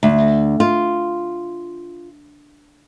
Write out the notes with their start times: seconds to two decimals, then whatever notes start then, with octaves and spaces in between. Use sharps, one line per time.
0.03 D2
0.60 F4